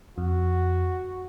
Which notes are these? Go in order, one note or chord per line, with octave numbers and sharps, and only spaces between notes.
F2 F#4